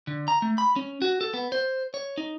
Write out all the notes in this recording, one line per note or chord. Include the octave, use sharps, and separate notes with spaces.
D3
A#5
A3
B5
C#4
F#4
A4
B3
C5
C#5
D#4